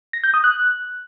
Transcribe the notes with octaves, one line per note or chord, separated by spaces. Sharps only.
A#6
G6
D#6
F#6